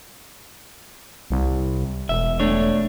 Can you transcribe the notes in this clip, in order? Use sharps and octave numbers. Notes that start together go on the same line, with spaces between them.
C2
E1 E5
A3 D4 C#5